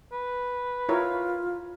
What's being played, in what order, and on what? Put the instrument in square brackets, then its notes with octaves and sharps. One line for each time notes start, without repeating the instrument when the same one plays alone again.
[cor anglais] B4
[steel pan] E4 A#4 C#5 [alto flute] F4